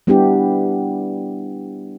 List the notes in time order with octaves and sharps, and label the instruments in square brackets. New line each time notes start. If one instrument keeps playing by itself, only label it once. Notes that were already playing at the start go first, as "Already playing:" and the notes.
[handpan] G3 B3 D4 E4 G4